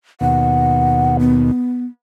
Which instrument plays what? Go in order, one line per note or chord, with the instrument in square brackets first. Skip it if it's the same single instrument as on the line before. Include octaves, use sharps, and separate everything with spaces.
[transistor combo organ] D#2 B2 [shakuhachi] F#5
[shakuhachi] B3